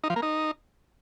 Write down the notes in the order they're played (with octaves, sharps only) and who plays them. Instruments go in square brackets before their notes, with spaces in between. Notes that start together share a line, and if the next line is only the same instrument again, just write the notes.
[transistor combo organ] D#4
F3
A#3
D#4